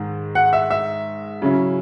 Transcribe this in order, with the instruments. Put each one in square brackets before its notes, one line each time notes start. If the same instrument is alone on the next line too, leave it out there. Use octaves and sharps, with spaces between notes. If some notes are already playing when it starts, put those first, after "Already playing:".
Already playing: [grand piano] G#2 D#3
[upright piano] F#5
E5
E5
[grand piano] C#3 F#3 C#4 E4